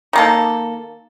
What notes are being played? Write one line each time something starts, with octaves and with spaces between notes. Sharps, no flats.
D#3 A#3 A4